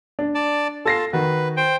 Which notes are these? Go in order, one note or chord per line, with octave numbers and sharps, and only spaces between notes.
D4
D5 A5
F4 A4 A5 A#6 C7
D#3 F#4 B4
C5 G5